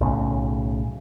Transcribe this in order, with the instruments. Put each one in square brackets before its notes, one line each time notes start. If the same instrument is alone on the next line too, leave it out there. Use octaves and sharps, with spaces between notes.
[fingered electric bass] B1 A2 C#3